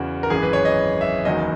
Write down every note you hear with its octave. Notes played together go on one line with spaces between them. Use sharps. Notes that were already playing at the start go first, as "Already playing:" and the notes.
Already playing: E2 C#3 E3 F#4
A#4
G#1 F#2 E3 G#4
B4
C#5
D#5
E5
F#1 E2 D#3 F#3 D#5